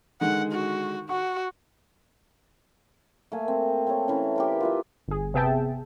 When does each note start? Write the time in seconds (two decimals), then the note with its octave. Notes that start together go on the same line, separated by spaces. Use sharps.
0.21 D3 D#3 G#3 F#5
0.53 F#4
1.09 F#4 F#5 C#6
3.32 A3 A#3 G#5
3.48 C4
3.87 C4 A4 C#5
4.08 E3 C#4
4.36 G4 A#4 C5
4.61 F4 B4 E5
5.08 G1 G#4
5.34 C3 B3 G#4 E5 G5 A5